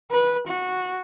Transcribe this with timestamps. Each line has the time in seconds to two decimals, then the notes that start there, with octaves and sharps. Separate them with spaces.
0.11 B4
0.47 F#4